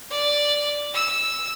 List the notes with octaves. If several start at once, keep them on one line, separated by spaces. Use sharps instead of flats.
D5
E6